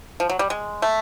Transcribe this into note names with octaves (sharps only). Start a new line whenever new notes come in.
F3
F#3
G3
G#3
A3